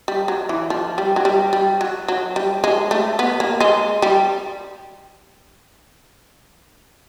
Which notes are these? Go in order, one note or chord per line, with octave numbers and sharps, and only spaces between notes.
G3
F#3
E3
F3
G3
F#3
G3
G3
F#3
F#3
G3
G#3
A3
B3
A#3
G#3
G3